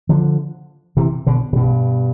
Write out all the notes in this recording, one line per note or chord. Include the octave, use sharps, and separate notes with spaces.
D3 F3
C3 E3
B2 D3
C3
G2 B2